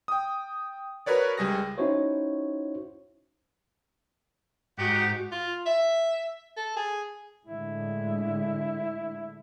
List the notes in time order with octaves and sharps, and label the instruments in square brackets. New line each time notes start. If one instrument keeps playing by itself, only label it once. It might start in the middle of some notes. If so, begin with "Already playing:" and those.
[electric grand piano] G5 D#6
F#4 A#4 B4 C#5 D5
C#2 G3 G#4 A#6
[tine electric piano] C#4 D#4 E4 F#4 C5 C#5
[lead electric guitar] G#2 [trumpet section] D#4 F#5 [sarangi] F#4 [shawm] G4
[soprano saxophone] F4
E5
A4
G#4
[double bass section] A2 D3 G#3 [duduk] E4